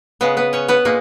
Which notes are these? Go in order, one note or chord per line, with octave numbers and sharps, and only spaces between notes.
C#3 G#3 B3 B4
B3 B4
C#4 C#5
B3 B4
A#2 G#3 A#3